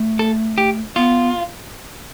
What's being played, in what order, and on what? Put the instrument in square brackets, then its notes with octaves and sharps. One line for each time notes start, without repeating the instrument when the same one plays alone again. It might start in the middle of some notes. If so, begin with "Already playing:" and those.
Already playing: [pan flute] A3
[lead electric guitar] A4
G4
[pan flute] B3 [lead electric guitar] F4